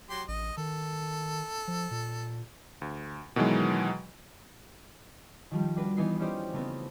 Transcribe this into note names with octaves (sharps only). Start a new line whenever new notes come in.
F#3 G4 C6
A1 D#5
D#3 A4
F3
A#2
D2
B2 D#3 E3 F#3 G#3
D#3 F3 G3
D4 F#4 B4
E3 B3 D#4 B4 C7
C#4 D#4 F4 G4 C5 D5
C#3 A3 B3 C4